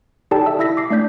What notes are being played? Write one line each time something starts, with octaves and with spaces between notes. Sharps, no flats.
D#4 G4 A4 D5 G5 A5
E5 E6
E4 E5 E6 A#6 B6
D6 C7
A3 D4 D5 G6 B6